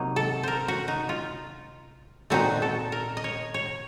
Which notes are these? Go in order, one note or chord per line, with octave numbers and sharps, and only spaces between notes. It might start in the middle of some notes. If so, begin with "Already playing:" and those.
Already playing: C3 F#3 A#3 D#4
A4
A#4 C5
F#4
D#4
F4
A#2 A3 C4 D#4 F#4
A4
A#4
D#5
C#5
C#5